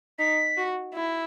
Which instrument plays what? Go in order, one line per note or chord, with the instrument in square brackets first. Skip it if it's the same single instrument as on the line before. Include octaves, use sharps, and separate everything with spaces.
[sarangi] D#4 [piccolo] B6
[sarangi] F#4
E4